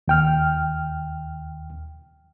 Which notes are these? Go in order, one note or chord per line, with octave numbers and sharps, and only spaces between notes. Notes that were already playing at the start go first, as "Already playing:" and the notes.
D#2 G5 F6